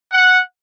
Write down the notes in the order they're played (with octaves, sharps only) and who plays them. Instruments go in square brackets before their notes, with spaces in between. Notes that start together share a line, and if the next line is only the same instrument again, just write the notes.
[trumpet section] F#5